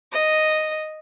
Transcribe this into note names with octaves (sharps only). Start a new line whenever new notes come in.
D#5